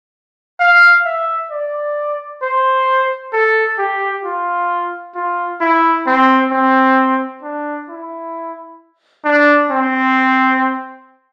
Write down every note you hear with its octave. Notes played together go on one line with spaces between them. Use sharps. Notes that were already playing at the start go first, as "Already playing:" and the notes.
F5
E5
D5
C5
A4
G4
F4
F4
E4
C4
C4
D4
E4
D4
C4